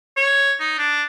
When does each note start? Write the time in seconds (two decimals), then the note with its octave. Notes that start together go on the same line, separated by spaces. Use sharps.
0.17 C#5
0.60 D#4
0.78 D4